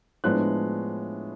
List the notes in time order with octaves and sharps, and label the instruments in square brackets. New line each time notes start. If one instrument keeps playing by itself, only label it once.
[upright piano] A2 F3 G#3 B3 D4 F#6